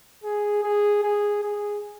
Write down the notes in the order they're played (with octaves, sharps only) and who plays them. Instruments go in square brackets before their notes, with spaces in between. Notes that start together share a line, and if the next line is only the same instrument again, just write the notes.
[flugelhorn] G#4
G#4
G#4
G#4